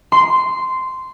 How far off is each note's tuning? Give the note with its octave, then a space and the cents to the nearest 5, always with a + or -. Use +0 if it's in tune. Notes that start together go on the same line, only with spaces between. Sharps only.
C6 -10